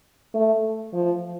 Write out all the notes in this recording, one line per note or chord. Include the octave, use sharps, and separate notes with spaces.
A3
F3